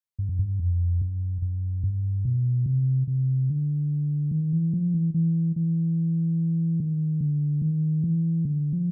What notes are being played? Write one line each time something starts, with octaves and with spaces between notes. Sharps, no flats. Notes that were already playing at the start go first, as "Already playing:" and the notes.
G2
F#2
G2
F2
F#2
F#2
G2
B2
C3
C3
D3
D#3
E3
F3
E3
E3
E3
D#3
D3
D#3
E3
D3
F3